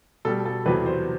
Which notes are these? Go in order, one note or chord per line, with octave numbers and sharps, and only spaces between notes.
B2 G3 A4
A4
E2 C3 F#3 B4
C5